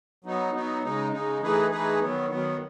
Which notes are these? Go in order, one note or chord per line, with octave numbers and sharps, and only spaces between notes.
F#3 B3 D#4
F#3 B3 D#4
C#3 G#3 D#4
C#3 G#3 D#4
E3 A3 D#4 G#4 B4
E3 A3 D#4 G#4 B4
D#3 F#3 B3
D#3 F#3 B3